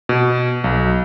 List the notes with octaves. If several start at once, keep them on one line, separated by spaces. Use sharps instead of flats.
B2
B1